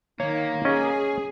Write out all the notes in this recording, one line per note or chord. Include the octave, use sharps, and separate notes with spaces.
D#3 A#3 C#5
C#4 G#4 D#5